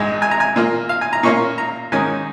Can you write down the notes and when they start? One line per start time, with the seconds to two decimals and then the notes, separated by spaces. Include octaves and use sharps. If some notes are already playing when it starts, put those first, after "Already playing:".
Already playing: A#1 G#2 G#3 G#5
0.22 G#5
0.31 A#5
0.40 G#5
0.56 A#2 A#3 F4
0.89 F5
1.01 G#5
1.13 A#5
1.23 A#2 A#3 C#4 F4 C#6
1.58 A#5
1.92 G#2 D#3 C#4 G#5